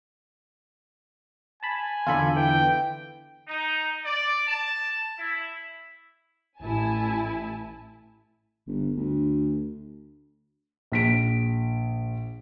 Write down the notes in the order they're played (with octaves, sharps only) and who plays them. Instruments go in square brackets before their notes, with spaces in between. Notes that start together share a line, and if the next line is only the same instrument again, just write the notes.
[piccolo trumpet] G#5 [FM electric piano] A5 B5
[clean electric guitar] E2 D3 D5 [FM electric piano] F4 A4 B5
[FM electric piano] E3 [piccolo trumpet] G5
[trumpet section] D#4
D5
A5
E4
[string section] A1 E4 G#5 A5
[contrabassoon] G1
D2
[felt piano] A#1 B6 D7